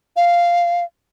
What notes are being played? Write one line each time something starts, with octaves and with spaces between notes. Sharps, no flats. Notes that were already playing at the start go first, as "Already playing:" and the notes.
F5